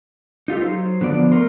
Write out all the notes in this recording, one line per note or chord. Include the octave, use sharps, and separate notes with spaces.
D#4 F4 G4 A4
F#3 C5
D3 F3 B3 D5
A3 A#4 C5